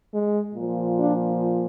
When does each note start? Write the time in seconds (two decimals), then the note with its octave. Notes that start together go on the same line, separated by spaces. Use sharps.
0.12 G#3
0.55 A#2 F3
0.98 D4 F4